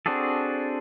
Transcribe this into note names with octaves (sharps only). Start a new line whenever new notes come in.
C4 D4 F#4 G#4 A4